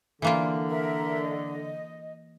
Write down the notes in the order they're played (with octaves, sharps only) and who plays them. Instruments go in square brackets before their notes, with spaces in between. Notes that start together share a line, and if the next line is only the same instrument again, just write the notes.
[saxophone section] D3 [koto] E3 A#3 F4
[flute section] A#4 E5
D#5